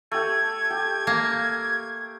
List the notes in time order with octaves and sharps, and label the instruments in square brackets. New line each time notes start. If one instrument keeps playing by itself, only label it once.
[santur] A3 G4 [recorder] G#6
[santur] G4
[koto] A#3